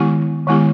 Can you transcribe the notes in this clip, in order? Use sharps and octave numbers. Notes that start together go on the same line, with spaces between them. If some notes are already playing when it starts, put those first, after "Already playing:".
Already playing: D#3 G#3 B3 E4 G4
D#3 G#3 B3 E4 G4